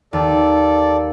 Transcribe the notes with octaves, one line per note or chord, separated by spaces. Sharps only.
D#2 A4 D5